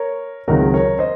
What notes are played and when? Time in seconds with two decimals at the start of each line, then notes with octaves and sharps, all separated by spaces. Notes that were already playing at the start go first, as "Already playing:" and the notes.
Already playing: A#4 C#5
0.48 C#2 C3 D#3 F#3 F#4 A#4
0.74 A#4 C#5
0.99 C5 D#5